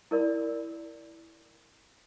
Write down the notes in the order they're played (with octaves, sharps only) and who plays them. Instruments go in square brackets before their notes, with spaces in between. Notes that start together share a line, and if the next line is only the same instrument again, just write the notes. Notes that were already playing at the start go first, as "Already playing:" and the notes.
[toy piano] E4 A#4 D5 B5